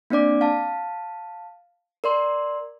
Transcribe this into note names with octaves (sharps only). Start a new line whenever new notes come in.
A#3 C4 D4 D5 D6
F5 A5
A#4 D5 C6